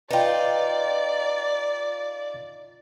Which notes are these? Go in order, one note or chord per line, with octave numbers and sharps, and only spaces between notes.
D#4 F4 B4 D5 G5